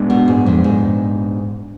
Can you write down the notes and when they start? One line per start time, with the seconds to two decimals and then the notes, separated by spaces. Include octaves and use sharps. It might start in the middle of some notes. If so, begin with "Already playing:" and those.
Already playing: A#2 G#3 B3 D4
0.10 B2
0.28 G#2
0.46 F2
0.64 G#2